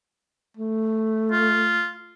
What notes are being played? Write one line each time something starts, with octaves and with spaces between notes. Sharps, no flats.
A3
F4